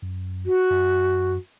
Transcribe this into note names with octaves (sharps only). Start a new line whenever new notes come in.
F#2
F#4
F#2